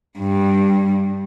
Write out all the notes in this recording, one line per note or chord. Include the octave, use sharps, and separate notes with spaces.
G2